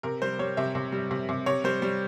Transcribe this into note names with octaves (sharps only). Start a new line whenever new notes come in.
C3 A#4
G3 C5
G3 C#5
C3 E5
C3
G3
C3
C3
C3 C#5
G3 C5
G3